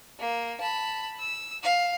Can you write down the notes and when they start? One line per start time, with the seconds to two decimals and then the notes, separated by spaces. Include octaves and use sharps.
0.19 A#3
0.60 A5 B5
1.19 E6
1.63 F5